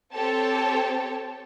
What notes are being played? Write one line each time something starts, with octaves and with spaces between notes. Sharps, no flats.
C4 G4 A4 C#5 G5 A5